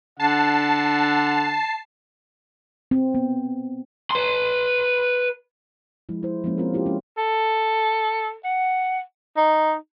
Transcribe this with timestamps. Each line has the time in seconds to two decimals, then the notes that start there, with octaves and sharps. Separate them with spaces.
0.20 D3 F#5 A5 C7
2.91 C4
3.15 B3
4.11 B4 C6
6.09 F3 G#3 E4
6.23 E4 C5
6.44 F3 G#3 A#3 C#4
6.58 C4 F4 F#4 A#4
6.74 E4 F4 G4
6.86 G#3 C#4
7.18 A4
8.44 F#5
9.37 D#4